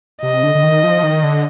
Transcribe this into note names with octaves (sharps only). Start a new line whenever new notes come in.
C3 D#5
D3
D3
D#3
F3
D#3
D3